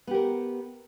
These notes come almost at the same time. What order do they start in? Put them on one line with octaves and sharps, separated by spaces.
B3 G4 A#4